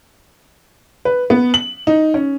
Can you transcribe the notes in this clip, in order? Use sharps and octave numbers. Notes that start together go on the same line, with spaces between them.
B4
B3
F#7
D#4
C#4